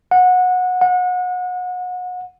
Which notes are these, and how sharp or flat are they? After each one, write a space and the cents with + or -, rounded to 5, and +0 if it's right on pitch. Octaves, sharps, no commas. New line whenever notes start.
F#5 -20
F#5 -30